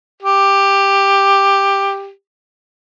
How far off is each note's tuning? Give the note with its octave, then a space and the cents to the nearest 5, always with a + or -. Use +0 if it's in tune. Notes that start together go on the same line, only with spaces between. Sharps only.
G4 +10